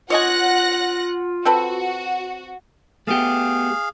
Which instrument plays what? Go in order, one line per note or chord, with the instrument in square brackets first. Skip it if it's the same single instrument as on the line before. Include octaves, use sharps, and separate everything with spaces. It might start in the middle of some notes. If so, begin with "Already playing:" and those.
[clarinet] F4 [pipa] C#5 D#5 G#5 [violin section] F#5 F#6 A#6
[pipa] C4 A4 B4 [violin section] F#4
[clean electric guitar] A3 B3 G4 [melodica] G#4 F5